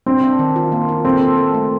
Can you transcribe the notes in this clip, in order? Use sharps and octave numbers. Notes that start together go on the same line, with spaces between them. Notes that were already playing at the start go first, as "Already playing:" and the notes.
C4 D4
D4
D#3
F4
A#3
F4
C4 A4
A4
A4
A3